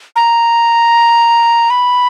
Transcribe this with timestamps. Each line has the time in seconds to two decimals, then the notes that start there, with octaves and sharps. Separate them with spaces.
0.16 A#5
1.70 B5